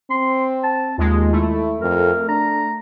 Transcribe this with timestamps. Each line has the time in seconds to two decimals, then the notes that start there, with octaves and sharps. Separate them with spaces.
0.10 C4 C6
0.63 A5
0.98 D#2 G#3 F4
1.32 A3 E4
1.81 F2 A#4
2.28 D4 A#5